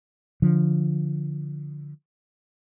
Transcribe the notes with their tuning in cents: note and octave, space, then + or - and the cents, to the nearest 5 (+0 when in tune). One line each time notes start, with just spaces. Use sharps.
D3 +0 F3 +0